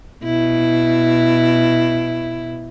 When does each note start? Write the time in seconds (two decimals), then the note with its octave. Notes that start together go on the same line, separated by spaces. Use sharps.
0.24 B2 E4